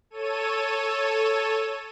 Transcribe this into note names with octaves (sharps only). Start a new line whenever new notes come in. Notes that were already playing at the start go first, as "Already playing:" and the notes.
A4 C#5 D#7